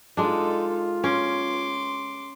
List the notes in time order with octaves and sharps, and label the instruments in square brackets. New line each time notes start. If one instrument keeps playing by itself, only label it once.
[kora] G#3 D4 [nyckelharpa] D#4 A4 [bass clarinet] F4
[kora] C#4 [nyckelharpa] C6 D6